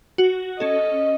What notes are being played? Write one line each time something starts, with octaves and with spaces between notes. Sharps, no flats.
F#4
C#4 A4 D#5